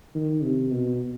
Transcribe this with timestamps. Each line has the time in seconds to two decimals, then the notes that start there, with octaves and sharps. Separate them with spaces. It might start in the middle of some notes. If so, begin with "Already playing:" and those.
0.15 D#3
0.43 C3
0.71 B2